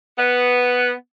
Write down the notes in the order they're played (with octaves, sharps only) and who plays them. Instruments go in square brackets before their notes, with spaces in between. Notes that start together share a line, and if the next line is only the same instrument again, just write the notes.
[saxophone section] B3